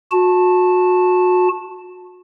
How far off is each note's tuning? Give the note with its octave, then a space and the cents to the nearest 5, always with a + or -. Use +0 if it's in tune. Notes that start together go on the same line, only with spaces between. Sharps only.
F#4 -30 A5 -5